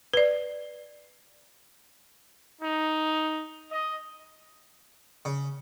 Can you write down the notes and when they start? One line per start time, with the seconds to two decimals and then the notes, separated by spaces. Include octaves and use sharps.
0.14 B4 D5
2.61 D#4
3.71 D#5
5.25 C#3